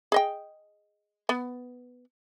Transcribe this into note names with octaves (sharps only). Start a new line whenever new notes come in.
G#4 D#5 G5
B3